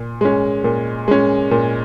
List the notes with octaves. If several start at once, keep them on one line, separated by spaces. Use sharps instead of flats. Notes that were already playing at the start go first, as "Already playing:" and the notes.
Already playing: A#2
G#3 C#4
A#2
G#3 C#4
A#2